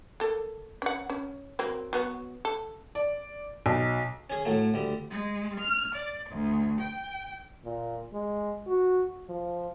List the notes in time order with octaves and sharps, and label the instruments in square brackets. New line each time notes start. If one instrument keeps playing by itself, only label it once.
[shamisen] A#3 A4
C#4 F#5
C#4
F#3 A#3 C4
F#3 B3 F#4
A4
[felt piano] D5
B1
[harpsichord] C#4 G#4
A2 F#3 A3
D2 G3
[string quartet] G#3
F6
D5
D2
G5
[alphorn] A#2
G#3
F#4
F3